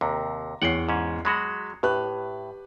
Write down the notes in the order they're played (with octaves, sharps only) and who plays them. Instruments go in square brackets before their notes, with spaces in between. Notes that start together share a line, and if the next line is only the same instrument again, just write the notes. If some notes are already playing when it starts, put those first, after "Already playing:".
[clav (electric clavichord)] D#2 C3 [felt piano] A#5
[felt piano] E2 C#5 C7 [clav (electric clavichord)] F#5 G5
[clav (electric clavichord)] G#2 C#4
[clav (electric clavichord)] F#3 G#3 F#4 [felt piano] B5
[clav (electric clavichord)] A2 [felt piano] G4 B4 F#6